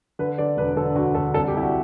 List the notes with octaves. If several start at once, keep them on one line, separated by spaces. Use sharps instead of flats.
D3 B4
D3 D5
E1 B4
D3 A4
D2 F#4
D2 A4
C2 A4
G4
C2 E4
F#4